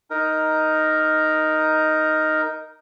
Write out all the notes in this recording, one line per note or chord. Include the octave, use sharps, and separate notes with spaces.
D#4 A#4